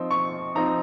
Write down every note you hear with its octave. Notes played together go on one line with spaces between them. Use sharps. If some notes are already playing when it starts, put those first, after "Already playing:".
Already playing: F3 C4 D#4
C#6
F3 C4 D#4 A#5